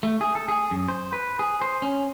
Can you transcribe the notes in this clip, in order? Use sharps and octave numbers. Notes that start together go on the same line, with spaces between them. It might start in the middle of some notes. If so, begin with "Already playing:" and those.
A3
G#4
A4
G#4
F#2
C5
B4
G#4
C5
C#4